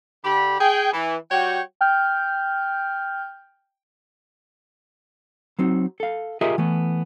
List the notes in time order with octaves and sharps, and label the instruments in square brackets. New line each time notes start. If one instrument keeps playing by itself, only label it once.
[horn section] D3 G4 B5
G#4 G5
E3
G3 F#4 C#5 F#5 G5
[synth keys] G5 F6 G6
[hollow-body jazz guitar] F#3 C4 D#4
A4 F5
F4 G4 G#4 A#4 D#5 E5
E3 A3 B3